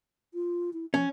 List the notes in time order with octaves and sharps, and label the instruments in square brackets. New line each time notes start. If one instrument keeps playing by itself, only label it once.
[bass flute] F4
E4
[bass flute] F3 [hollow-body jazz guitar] C#4